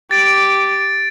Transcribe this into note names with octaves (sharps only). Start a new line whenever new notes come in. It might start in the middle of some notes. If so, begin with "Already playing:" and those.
G4 D6 A6 D7